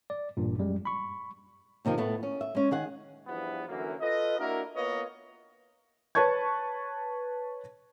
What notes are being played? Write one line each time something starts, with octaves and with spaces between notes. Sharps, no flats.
D5
A1 G2 A#2
F#2 G3 G#3
B5 C#6
D#2 C3 D#3 F3
A2 A3 B3
C#4
E5
G#3 C#4
D#3 G#4 F#5
E2 G2 E3 F3 B3
F#2 D3 E3 F#3 A#3
F4 A4 B4 D#5
A#3 D4 E4 F#4 A#4
A#3 B3 F4 B4 C#5 D#5
B4 C#5 A5 C#6 G#6